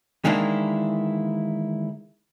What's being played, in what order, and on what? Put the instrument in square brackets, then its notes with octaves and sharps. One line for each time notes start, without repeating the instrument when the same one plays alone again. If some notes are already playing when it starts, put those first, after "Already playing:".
[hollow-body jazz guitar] D#3 E3 G#3 A#3 D4 E4